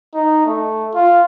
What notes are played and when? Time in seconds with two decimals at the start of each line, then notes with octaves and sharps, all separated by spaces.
0.14 D#4
0.46 A3
0.94 F4